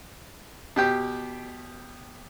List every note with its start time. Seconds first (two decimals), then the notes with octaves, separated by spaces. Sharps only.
0.76 B2 G4 G5